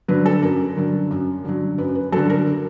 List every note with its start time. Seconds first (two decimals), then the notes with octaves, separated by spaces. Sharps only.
0.08 D3 F#3 B4
0.26 A4
0.42 F#2 A#4
0.77 D3 F#3
1.10 F#2
1.45 D3 F#3
1.78 F#2 B4
1.95 B4
2.12 F#3 A4
2.17 D3
2.30 A#4